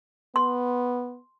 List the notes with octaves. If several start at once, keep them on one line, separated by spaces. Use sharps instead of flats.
B3 C6